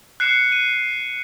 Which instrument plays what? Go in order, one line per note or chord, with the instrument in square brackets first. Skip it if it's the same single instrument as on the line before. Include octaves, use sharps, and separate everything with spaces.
[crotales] F#6 C7 C#7 E7
D#7